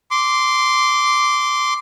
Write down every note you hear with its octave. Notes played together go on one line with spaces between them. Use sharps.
C6 D6